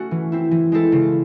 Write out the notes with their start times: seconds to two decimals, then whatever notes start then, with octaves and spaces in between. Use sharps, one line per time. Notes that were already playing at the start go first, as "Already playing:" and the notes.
Already playing: A3 C#4 F#4
0.11 E3
0.32 C4 E4
0.51 E3
0.72 G#3 C4 E4 A4
0.92 C#3